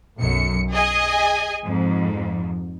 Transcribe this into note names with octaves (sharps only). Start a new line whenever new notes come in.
B1 F#2 C#7
G#4 D#5 G#5
F2 G#2